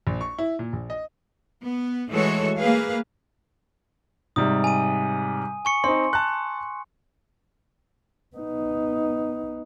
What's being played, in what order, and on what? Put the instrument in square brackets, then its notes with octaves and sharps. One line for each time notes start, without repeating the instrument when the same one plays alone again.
[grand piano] A#1
C#6
E4
A#2
A#1
D#5
[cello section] B3
E3 G#3 A3 F#4 A4 C#5
A#3 G#4 B4 F5
[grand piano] G#2 C3 G3 [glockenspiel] D#6
[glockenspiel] G#5 D#7
G#5 C#6 C#7
[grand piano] C4 D#4 [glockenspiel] C6
[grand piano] A5 F#6
[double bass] B3 D#4